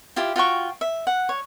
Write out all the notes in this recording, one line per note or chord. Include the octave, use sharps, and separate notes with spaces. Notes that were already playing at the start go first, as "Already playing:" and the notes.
E4 F4 G4
F4 F#4 G5 C#6
E5
F#5
C#5